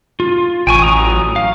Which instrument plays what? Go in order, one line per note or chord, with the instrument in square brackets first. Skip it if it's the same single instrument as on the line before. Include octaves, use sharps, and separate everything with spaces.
[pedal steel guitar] F4
[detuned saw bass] A1 [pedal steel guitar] G5 G#5 C#6
[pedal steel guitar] F#3 A#5 D#6
F5